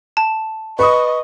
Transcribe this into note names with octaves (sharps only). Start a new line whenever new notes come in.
A5
B4 D#5 C#6 D#6